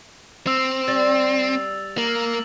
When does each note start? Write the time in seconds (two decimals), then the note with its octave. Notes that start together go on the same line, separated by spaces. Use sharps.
0.47 C4 E6 F7
0.88 G3 A6
1.98 A#3 F#7